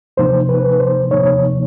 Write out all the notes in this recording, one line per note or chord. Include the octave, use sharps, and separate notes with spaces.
E2 C3 F3 A#3 D#4 C5
B4
C5
E2 C3 F3 A#3 D#4 C#5